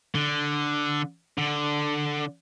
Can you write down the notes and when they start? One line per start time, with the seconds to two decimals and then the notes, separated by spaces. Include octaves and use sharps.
0.15 D3
1.38 D3